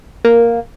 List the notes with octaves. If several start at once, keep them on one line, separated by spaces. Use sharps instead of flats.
A#3